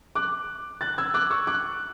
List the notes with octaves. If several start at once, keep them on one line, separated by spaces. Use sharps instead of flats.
D6 F#6
F#6 A6
E6 G#6
D6 F#6
C#6 E6
D6 F#6